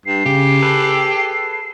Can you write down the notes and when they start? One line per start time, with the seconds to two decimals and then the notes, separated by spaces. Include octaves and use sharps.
0.06 G2 C7
0.26 C#3 G4
0.62 G#4 A4 B4